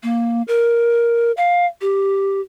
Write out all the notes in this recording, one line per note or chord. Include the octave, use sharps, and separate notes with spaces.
A#3
A#4
F5
G4